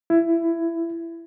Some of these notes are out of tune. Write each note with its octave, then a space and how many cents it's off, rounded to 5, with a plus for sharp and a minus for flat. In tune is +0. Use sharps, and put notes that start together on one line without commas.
E4 +15